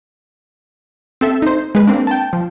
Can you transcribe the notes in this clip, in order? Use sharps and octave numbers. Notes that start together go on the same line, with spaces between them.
C4 A4 E5
D#4 C5
G#3 B4
A#3 C4 D4
G5 A5
F3